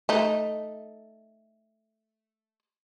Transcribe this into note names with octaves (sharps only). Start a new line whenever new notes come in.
A3 D#4